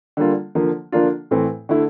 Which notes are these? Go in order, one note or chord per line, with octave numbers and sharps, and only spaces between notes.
D3 G3 A#3 F4
D3 F3 A#3
D3 F3 A#3 D4 F4
A2 E3 A3 C4
D3 A3 E4